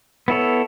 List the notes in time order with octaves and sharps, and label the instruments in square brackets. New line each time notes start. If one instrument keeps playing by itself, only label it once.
[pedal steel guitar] B3 E4 A4 C#5